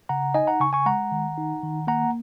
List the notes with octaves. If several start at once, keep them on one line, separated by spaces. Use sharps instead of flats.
C#3 F#5 A#5
D#4 D#5 G#5
F#5 A#5
C#3 G#5 C#6
G#5 C#6
G#3 F#5 A#5
D#3
D#4
D#3
A#3 F#5 A#5